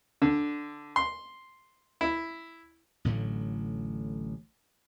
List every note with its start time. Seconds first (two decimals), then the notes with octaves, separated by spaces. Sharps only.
0.22 D3
0.96 C6
2.01 E4
3.05 A1 A2 D3 F#3